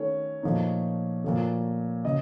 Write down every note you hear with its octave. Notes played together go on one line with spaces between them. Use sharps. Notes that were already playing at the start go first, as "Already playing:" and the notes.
Already playing: D#3 A3 C#4 C#5
A#2 F3 A3 D#4
A#2 F3 A3
C#3 D#5